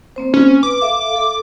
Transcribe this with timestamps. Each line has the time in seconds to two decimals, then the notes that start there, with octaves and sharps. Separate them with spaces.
0.16 A#3 C4 C5
0.34 C#4
0.63 B4 D6
0.82 A4 E5 F5
1.16 A4